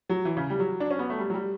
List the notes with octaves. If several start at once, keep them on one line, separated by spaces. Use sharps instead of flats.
F#3
E3
C#3
G3
F#3
D4
C#4
B3
A3
G3
F#3
G3